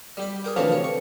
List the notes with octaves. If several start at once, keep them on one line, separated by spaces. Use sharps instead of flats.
G3 G4 B5
G#4 A#4 G5
D2 C3 E3 F3 C#5 F5
C#5
C#6